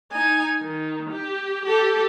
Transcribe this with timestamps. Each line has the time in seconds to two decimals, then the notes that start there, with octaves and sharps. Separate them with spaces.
0.12 D#4 G#5
0.62 D#3
1.10 G4
1.65 G4 A4